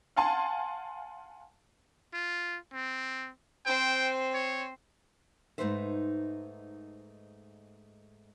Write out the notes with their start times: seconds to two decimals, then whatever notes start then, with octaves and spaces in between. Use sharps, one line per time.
0.16 F5 F#5 G#5 A5 C6
2.13 F4
2.73 C4
3.66 C4 C5 G5
4.34 C#5
5.58 G#2 A3 D#4 B4 C5 E5